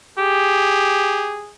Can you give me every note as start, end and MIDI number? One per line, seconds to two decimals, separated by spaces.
0.18 1.42 67
0.18 1.54 68